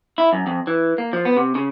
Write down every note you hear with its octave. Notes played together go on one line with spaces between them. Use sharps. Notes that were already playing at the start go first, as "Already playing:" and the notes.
E4
F#2
F2
E3
A#3
F3
B3
C3
C#3